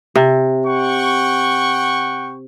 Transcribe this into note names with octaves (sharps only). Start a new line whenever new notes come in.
C3
F#5 G5 C#6